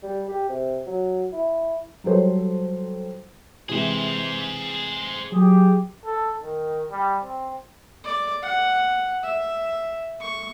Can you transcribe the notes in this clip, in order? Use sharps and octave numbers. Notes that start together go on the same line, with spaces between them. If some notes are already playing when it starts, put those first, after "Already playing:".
G3
G4
C3
F#3
E4
F#3 G3 A4 C5 C#5
C3 E3 G#3 G#4 C5
F#3 G4 G#4
A4
D#3
G3
C4
D5
F#5
E5
C#6